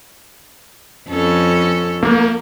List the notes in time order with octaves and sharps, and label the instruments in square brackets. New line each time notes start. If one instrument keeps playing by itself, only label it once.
[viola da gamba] F2 C#4 A4
[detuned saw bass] A#3